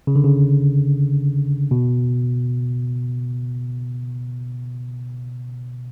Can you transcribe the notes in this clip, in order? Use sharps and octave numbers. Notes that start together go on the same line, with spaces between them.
C#3
D3
C#3
B2